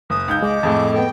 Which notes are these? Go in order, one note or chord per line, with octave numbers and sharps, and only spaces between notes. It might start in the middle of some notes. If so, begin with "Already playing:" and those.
F#1 D#6
C#2 D#4 G6
G#3 D#5 D6
F2 A2 G#4 A5
B3 A4 G5